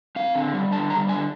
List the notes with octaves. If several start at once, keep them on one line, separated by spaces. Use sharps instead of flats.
C4 F5
D3
G3
D3 A5
G3 A#5
D3 G#5